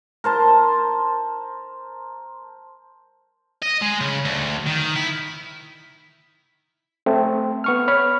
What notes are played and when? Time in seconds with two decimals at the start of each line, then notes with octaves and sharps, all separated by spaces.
0.24 A#4 C5 A5 C6
3.62 D#5
3.82 G#3
4.01 C#3
4.25 D2
4.67 D#3
4.96 E4
7.06 A3 C4
7.64 B3 C#6 F6
7.88 C#5 B5 F6